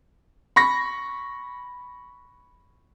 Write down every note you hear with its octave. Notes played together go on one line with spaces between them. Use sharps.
B5 C#6 A#6